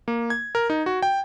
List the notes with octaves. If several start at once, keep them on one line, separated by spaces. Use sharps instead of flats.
A#3
G#6
A#4
D#4
F#4
G5